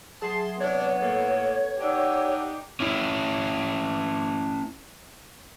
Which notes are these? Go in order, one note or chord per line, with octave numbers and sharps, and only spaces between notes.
F#3 G#4 E5 A5 C6
C3 G#3 B3 D4 C#5
A2 A#3 A4
D4 D#4 G4 D5 F#5 E6
C#4 E4